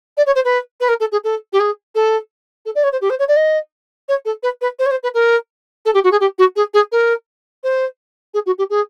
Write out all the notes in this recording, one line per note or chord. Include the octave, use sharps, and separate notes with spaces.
D5
C#5
C5
B4
B4
A#4
A4
G#4
A4
G4
G#4
A4
A4
D5
C#5
C5
G4
C5
C#5
D5
D#5
C#5
A4
B4
B4
C5
C#5
C5
B4
A#4
A4
G4
F#4
G#4
G4
F#4
G#4
G#4
A#4
C5
G#4
F#4
G4
G#4